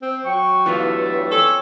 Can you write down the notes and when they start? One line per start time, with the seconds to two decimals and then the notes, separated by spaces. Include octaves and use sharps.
0.02 C4
0.25 F#3 G5 C#6
0.66 G2 E3 A3 B3 F4
1.31 C4 C#4 A4 C#5